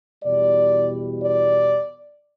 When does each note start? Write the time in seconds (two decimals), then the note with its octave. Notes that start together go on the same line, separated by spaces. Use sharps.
0.23 E2 B2 G3 D5
1.21 D5